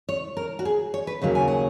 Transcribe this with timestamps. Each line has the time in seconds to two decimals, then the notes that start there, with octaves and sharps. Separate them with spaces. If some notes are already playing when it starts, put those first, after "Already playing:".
0.09 C#5
0.37 A#4
0.59 F#4
0.65 G#4
0.94 C#5
1.07 B4
1.22 D#2 C#3 F#3 A#3
1.35 G#5
1.48 F#5